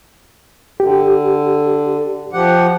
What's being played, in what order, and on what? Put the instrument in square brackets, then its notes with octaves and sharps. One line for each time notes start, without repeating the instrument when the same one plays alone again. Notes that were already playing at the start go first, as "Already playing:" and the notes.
[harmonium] D3 [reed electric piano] G4
[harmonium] F3 G4 F#5